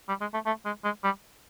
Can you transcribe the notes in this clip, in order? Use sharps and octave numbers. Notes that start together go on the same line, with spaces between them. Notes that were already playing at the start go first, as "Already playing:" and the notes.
G3
G#3
A3
A3
G#3
G#3
G3